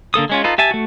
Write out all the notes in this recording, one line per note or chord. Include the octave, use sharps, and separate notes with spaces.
D3 A#3 A4 D#6
G#3 C#4 F4
D#4 F4 A4 B4
G4 E5 G#5 A5
A3 F#4